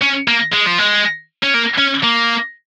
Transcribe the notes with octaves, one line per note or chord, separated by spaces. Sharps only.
C#4
A#3
G#3
F3
G#3
C#4
A#3
C#4
A#3